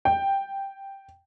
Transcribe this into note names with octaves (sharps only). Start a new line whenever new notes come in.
G5